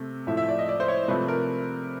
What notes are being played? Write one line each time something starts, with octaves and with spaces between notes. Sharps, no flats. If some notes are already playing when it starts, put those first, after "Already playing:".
Already playing: C3 A3
A2 F3 A3 E5
E5
D5
D#5
D5
C5
C#5
C3 F3 A3 B4
A#4